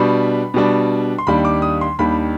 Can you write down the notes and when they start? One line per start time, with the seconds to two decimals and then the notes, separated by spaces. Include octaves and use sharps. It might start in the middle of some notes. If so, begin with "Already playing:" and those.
Already playing: B2 G3 D4 B5
0.54 B2 G3 D4
1.18 C6
1.27 D#2 D#3 G3 D4 B5
1.45 D6
1.62 D#6
1.81 C6
1.99 D#2 D#3 G3 D4 B5